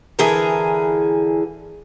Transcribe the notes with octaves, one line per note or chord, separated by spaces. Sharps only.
D3 E3 G#4 A#4